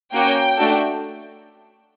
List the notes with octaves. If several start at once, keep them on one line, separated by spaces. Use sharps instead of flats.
A#3 C#4 F#4 G5
A3 D4 F#4 A4